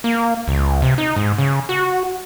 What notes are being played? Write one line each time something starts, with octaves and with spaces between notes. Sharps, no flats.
A#3
C#2
C3
D#4
G#2
C#3
F#4